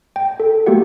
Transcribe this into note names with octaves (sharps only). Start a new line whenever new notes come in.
G5
A4
A3 A#3 F#4 G4 F#5